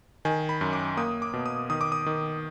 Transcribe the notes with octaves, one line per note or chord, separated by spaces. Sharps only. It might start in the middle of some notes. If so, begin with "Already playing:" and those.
D#3 G#5
B5
F#2
D6
A#3 D#6
D6
B2
D#6
D#3 D#6
D6
D#6
D#3